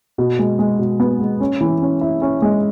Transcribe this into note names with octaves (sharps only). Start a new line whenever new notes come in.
B2
G#3
G#3
B2
B3
G#3
C#4
E3
C#4
E4
C#4
G#3